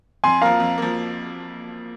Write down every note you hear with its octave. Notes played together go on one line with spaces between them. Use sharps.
F2 G#5 C6
F3 A#3 F5 A#5
F2
F3 A#3